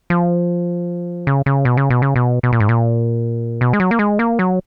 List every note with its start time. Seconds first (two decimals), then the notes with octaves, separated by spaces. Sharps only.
0.10 F3
1.27 C#3
1.46 C#3
1.65 B2
1.77 C#3
1.90 B2
2.02 C#3
2.16 B2
2.43 B2
2.53 A#2
2.60 G#2
2.69 A#2
3.61 B2
3.73 G#3
3.80 F#3
3.91 A#3
3.99 G#3
4.19 A#3
4.39 F#3